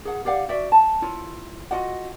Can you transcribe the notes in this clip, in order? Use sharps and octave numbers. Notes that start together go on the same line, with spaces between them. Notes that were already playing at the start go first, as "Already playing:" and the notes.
G#4 F#5
G4 D5 F5 F#5
F#4 D5 E5
A5
E4 F4 C#5
F4 F#4 D#5 F#5